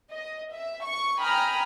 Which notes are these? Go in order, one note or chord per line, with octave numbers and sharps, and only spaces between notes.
D#5
E5
C#6
G5 G#5 A#5 B5 D#6 F6